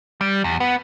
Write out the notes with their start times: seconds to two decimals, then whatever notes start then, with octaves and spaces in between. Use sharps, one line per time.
0.21 G3
0.44 E2
0.60 B3